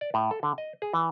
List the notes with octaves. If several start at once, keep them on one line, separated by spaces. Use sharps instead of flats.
D5
A2
A4
D3
D#5
G#4
E3